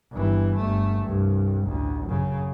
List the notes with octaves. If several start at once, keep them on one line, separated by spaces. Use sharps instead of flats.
G1 E3
G1 A3
C2 G2
A1 D2
F#2 C#3